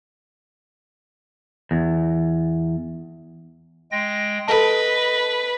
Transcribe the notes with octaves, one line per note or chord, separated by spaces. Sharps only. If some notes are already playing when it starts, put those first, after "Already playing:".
E2
G#3 G5 A#6
A4 B4 D#5 A5